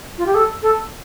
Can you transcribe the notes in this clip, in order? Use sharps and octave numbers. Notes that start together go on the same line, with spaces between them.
F4
G4
A4
A4